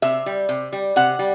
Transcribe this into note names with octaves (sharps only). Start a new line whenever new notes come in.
C3 E5
G3
C3
G3
C3 F#5
G3